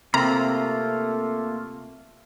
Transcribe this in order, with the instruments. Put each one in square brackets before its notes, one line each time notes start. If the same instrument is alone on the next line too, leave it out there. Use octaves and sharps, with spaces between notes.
[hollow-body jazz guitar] C3 [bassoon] A3 [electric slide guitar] A#3 F4 [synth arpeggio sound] A#5